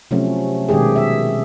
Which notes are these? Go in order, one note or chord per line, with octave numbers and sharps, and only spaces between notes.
C3 F3 F#3 A3 C4 C#4
B2 D#3 G#3 G4 G#4
E5